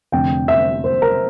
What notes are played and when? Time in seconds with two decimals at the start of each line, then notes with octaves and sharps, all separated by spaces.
0.12 F1 F2 D3 G5
0.48 E5
0.84 C5
1.02 A#4